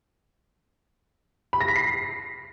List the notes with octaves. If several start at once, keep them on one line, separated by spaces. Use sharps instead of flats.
B5
A#6
B6
C7